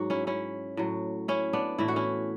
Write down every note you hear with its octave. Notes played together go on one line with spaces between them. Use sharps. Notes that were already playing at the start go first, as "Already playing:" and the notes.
Already playing: G#2 F#3 F#4
C#4 E4
C#4 E4
A2 F#3
C#4 E4
B3 D4
A2 E3 E4
F#4
C#4 E4